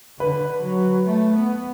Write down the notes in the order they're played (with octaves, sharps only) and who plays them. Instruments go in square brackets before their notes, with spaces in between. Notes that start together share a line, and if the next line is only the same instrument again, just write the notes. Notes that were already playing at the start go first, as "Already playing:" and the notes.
[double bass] D3 [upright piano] B4
[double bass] F#3
A3
B3